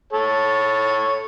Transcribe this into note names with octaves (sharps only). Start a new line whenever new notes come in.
A4 C#5